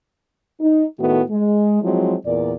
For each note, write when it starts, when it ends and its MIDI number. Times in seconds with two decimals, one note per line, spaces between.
0.61 0.84 63
1.00 1.22 45
1.00 1.22 51
1.00 1.22 57
1.00 1.22 59
1.00 1.22 66
1.30 1.80 56
1.82 2.15 53
1.82 2.15 54
1.82 2.15 56
1.82 2.15 60
1.82 2.15 64
2.26 2.54 40
2.26 2.54 46
2.26 2.54 70
2.26 2.54 74